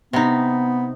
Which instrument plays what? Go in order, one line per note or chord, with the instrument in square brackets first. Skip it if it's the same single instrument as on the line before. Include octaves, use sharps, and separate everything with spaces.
[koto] C3 D#4 [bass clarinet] B3